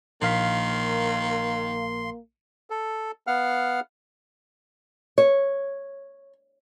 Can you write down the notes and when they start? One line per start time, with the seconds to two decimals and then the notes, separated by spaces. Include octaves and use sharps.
0.22 A#1 D#3 A#3 F5 C6 B6
2.70 A4
3.27 B3 F5 F#5 F6
5.18 C#5